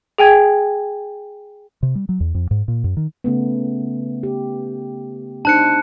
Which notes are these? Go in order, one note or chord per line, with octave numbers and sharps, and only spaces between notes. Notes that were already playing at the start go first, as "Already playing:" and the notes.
G#4 G5 G#5 G#6
C3
G3
F#3
E2
F2
G#2
A#2
F#2
D#3
C#3 A3 B3
G4
D4 D#4 C5 A5 F#6 C#7